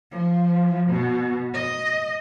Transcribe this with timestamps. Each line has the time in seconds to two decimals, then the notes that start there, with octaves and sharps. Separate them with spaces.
0.11 F3
0.89 B2
1.54 D#5